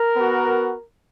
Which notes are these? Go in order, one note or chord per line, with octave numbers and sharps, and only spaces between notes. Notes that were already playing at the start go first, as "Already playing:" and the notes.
Already playing: A#4
B3 F#4